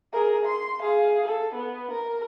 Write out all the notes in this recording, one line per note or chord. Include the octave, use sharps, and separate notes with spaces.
G#4 A#4
C6
G#4 F5
A4
B3
A#4